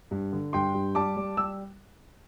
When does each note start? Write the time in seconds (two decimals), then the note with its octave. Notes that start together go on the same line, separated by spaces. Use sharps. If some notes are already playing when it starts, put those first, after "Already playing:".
0.11 G2
0.33 D3
0.53 G2 G5 C6
0.75 G2
0.95 G3 A5 D6
1.17 G3
1.37 G3 E6